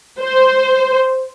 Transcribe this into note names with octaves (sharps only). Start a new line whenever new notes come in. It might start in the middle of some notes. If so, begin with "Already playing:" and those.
C5